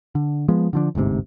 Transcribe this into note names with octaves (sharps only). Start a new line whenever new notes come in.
D3
F3 G#3 B3
D3 F3 D4
G1 D2 G#2 C3